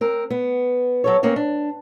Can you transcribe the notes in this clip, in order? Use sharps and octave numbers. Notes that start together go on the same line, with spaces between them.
C4 A#4
B3
F#3 A4 C#5
A#3 C4 C#4 C#5
D4